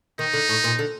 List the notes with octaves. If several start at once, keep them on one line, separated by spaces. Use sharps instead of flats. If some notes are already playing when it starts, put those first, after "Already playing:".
D#3 D#4
D3
A2
A#2
D3